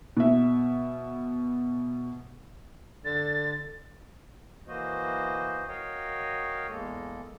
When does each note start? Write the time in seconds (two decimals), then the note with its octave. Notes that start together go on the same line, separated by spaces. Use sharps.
0.17 B2 E5
3.05 D3 A6
4.68 E3 A#3 F#4 C5 D#5
5.68 F#4 A#4 C#5 D#5 F5 G5
6.69 E2 G#3 A#3 A4